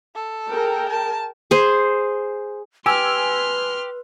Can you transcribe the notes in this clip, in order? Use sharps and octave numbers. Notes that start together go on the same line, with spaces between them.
A4
G#4 A#4 G5
A5
G#4 C5
G4 B4 G#5 C6 E6 F6